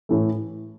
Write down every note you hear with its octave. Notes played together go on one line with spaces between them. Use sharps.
A2 E3 A3